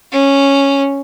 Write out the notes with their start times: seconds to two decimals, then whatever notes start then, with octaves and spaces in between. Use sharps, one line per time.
0.12 C#4